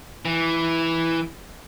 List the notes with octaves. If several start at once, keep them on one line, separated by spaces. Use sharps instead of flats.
E3